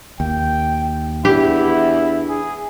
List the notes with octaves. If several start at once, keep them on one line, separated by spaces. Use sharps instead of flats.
D#2 G5
E2 D4 E4 G4
G#4